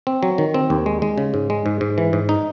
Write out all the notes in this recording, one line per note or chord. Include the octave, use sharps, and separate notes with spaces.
C4
F#3
D#3
C4
D#2
G#3
G#3
C#3
G#2
G#3
G#2
G#2
E3
G#2
D#4